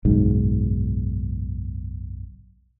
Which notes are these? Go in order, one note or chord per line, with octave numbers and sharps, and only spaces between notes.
F#1 B1 G#2